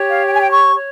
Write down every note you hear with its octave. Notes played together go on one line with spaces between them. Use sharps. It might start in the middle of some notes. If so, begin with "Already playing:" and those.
Already playing: G4 C#5
F5
G5
G#5
G5
C#6
C#5